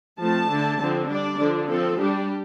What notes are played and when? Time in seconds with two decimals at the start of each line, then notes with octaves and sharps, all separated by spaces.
0.19 F3 A3 C4 A5
0.49 D3 A3 D4
0.79 D3 F3 C4
1.09 G3 D4 D5
1.38 D3 F3 D4
1.68 F3 C4 A4
1.98 G3 D4 G4